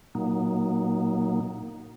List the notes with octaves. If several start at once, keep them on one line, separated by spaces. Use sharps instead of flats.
A#2 F#3 A#3 D#4